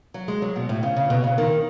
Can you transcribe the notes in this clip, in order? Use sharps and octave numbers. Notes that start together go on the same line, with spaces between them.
F#3
G#3
F#3
B2
A2
C#3
C#3
B2
C#3
D#3